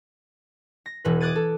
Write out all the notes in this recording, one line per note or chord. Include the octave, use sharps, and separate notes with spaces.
A#6
E1 E3 B4
D6 D#6 F#6 G#6 A6 D#7
A4